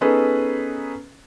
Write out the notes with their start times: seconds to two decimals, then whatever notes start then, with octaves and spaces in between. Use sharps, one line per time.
0.01 B3 C#4 D#4 G#4 A4 B4